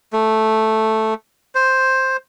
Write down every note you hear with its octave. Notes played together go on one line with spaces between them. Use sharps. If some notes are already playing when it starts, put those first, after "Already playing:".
A3
C5